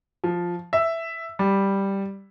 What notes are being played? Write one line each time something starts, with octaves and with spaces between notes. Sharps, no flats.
F3
E5
G3